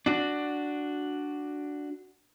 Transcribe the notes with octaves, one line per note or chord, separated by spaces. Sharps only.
D4 F#4